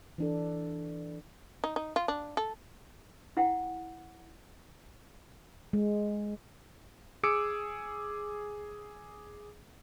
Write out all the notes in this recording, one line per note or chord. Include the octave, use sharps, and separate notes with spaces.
E3 D4 A4
D#4
D#4
F4
D4
A4
E4 F#5 G5
G#3
G#4 D6 E6 C#7 D7